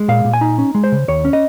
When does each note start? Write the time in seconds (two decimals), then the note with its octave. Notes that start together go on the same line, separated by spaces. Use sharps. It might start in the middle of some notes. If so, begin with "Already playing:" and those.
Already playing: G#3
0.08 A#2 F5
0.25 A#2
0.33 G#5
0.41 D#4
0.58 C#4
0.75 G#3
0.84 C5
0.92 C#3
1.08 D#2 C#5
1.25 C#4
1.33 D#5